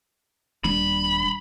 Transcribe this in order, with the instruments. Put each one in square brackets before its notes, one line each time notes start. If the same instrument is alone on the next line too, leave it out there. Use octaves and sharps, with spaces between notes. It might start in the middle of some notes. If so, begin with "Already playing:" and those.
[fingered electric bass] D#1 G3 D4 [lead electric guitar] B5